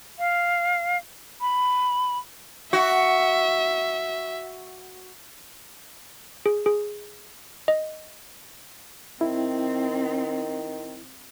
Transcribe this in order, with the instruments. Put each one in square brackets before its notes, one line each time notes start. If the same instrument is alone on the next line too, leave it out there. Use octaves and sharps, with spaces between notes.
[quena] F5
B5
[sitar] F#4 [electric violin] E5
[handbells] G#4
G#4
D#5
[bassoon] D#3 [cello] C4 [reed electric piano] E4